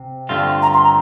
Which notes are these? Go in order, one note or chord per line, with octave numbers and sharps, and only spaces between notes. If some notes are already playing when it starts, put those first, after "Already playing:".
Already playing: C3
G2 D3 A3 C4 F4
A#5
C6
A#5